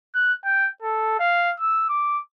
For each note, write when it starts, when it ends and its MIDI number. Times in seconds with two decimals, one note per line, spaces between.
0.14 0.33 90
0.45 0.69 79
0.82 1.18 69
1.19 1.51 77
1.59 1.85 88
1.89 2.20 86